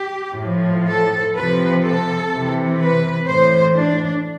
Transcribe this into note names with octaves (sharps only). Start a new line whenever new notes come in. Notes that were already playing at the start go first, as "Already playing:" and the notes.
Already playing: G4
A2 F3
A4
C3 F3 B4
A4
C3 E3
B4
A2 E3 C5
D4